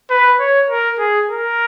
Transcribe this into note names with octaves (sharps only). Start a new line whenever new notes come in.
B4
C#5
A#4
G#4
A#4